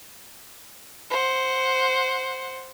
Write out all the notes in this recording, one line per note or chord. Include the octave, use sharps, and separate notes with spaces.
C5 F#5